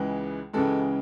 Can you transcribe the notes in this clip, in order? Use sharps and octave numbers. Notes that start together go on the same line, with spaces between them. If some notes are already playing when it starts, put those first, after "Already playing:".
Already playing: C#2 C#3 E3 G#3
C#2 C#3 E3 G#3 A4